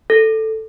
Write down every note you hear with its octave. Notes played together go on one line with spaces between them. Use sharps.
A4